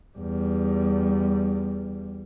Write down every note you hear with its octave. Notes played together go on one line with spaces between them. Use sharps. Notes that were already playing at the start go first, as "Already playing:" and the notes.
E2 G3